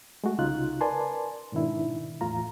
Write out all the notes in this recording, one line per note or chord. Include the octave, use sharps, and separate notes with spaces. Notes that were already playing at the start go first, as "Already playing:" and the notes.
G#3 A3 F#4
C2 C#3 D#4 F4 F#6
A#4 B4 D5 G#5 A5 C6
G#2 B2 D#3 D4 E4
E2 A2 F4 A#5